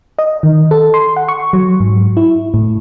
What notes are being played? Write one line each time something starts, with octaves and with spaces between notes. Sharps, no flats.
D#5
D#3
A4
C6
F#5
C#6
F#3
G#2
E4
A2